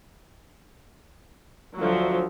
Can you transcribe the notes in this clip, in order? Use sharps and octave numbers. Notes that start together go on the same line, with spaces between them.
D2 F3 F#3